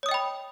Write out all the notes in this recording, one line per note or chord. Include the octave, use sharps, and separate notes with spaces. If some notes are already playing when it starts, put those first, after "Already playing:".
C#5 D#5 G5 B5 D#6